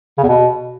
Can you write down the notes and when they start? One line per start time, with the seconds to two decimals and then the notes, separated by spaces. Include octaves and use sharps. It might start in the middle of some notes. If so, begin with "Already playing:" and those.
0.18 C#3
0.23 E2
0.29 B2